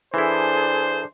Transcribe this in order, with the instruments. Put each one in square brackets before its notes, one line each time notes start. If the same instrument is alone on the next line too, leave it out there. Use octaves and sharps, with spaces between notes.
[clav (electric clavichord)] E3 E4 [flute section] D4 G#4 A4 [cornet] C5